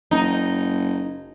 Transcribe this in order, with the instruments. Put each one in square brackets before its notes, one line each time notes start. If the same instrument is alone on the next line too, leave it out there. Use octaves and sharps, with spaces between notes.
[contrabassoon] F#1 [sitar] D#4